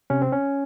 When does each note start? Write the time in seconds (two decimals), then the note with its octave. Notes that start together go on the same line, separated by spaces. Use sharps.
0.10 C3 C#4
0.22 C4
0.32 C#4